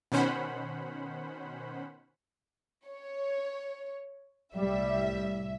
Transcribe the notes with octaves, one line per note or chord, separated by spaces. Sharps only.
B2 D#3 C#4 C5 F#5 B5
C#5
C2 A2 G3 E5